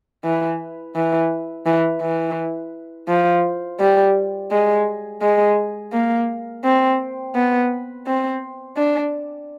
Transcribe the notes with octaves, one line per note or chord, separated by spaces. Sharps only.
E3
E3
E3
E3
F3
G3
G#3
G#3
A#3
C4
B3
C4
D4